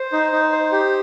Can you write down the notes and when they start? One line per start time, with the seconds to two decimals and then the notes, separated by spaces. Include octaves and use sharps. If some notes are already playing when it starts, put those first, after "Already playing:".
Already playing: C5
0.13 D#4
0.32 D#4
0.52 C5
0.72 G4